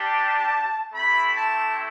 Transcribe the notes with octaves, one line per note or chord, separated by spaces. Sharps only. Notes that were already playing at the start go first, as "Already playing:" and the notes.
Already playing: G3 D4 G4 A5
A3 C4 E4 G4 B5
A5